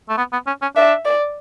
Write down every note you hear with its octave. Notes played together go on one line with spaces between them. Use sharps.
A3
B3
B3
C#4
C#4
D4 E5
D5